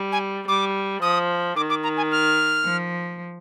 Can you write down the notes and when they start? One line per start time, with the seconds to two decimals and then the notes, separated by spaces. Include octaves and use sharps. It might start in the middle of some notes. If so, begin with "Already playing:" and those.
Already playing: G3
0.12 G#5
0.47 G3 D6
1.02 F3 D#6
1.56 D#3 D6
1.70 D6
1.83 A#5
1.97 G#5
2.11 F6
2.65 F3